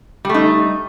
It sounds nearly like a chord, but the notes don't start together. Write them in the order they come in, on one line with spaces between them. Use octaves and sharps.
G3 A3 D#4